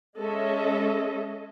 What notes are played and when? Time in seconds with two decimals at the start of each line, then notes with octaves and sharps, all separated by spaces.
0.18 G#3 C#4 A4 D#5 E5